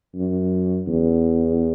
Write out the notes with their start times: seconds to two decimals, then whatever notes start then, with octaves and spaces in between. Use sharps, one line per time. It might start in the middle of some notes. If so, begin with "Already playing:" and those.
0.15 F#2
0.87 E2